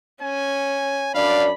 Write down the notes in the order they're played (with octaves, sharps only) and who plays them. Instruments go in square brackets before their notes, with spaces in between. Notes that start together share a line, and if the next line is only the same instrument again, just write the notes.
[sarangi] C#4 [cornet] G#5
[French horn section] F#2 D4 D5 [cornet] F5 [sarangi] B5